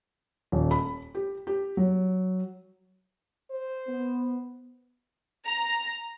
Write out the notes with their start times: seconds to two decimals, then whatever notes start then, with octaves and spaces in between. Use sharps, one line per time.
0.52 D#1
0.71 B5
1.15 G4
1.47 G4
1.77 F#3
3.51 C5
3.88 B3
5.46 A#5